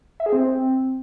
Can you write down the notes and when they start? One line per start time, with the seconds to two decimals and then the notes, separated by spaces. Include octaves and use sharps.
0.20 E5
0.26 G#4
0.32 C4